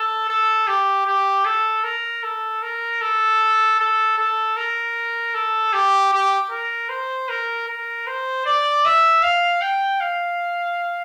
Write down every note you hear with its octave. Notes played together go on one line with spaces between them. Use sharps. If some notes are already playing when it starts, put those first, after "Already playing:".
Already playing: A4
A4
G4
G4
A4
A#4
A4
A#4
A4
A4
A4
A#4
A4
G4
G4
A#4
C5
A#4
A#4
C5
D5
E5
F5
G5
F5